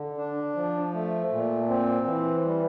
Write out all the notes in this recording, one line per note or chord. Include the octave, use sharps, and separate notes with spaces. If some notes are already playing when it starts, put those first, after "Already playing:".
Already playing: D3
D4
F3
A3
A#2
C4
E3
G3